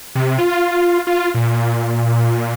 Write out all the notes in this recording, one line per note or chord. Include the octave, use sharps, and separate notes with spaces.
C3
F4
F4
A#2